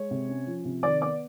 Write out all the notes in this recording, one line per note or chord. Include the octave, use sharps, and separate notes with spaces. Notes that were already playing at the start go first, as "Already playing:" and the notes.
Already playing: G#3 C#5
C3
C#4
F3
C3
D#3 D5 D6
B3 D5 D6